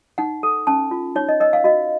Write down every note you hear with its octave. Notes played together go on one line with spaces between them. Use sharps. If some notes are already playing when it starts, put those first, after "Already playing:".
D#4 F#5
A4
C#4 A5
F4
D#4 C#5
D#5
A#4 D#5
F5
F#4 D#5